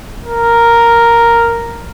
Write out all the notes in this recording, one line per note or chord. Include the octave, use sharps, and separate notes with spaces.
A#4